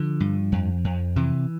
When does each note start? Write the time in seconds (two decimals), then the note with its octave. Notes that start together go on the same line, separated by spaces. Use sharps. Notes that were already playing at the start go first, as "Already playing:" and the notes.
Already playing: D3 F3
0.20 G2
0.52 F2
0.84 F2
1.16 C3 E3